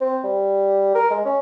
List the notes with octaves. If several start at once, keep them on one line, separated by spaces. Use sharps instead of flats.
C4
G3
A#4
G#3
C#4